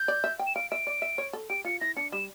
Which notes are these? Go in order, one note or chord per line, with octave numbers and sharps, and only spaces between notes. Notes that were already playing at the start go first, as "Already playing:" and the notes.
Already playing: G6
D5
E5
G5
E7
F5 D7
E5 D7
D5
E5
C#5
A4
G4 D7
F4 C#7
E4 A#6
D4 C#7
G3 E7